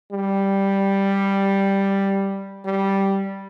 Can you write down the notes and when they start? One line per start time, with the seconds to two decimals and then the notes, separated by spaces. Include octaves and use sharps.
0.11 G3
2.65 G3